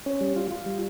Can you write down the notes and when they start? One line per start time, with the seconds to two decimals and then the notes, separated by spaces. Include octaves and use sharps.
0.06 C#4
0.21 G3
0.36 F4
0.51 F4
0.66 G3